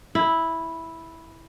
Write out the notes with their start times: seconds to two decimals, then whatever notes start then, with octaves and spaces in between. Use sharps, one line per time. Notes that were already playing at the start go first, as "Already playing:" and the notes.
0.15 E4